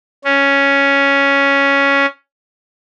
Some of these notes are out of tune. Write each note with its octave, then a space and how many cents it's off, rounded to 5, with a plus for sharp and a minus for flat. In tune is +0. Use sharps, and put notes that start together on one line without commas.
C#4 +5